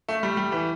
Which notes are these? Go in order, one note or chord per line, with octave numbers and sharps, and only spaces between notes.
A3
G3
G3
E3